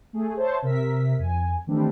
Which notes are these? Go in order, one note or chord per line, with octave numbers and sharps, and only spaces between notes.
A3 G#4
C5 C#5 E5 A5
C3 A#4 E5 B6
F2 G#5
D#3 E3 G3 A3 C4 D4